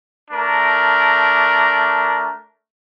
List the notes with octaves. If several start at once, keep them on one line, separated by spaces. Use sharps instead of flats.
A3 D4 A#4